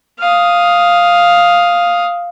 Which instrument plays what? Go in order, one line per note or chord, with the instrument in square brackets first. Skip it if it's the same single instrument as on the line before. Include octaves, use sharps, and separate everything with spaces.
[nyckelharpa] F5 D#6